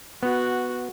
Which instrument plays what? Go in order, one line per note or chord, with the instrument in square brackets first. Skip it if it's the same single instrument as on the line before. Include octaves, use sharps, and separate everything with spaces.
[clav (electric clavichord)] B3 [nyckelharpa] F#4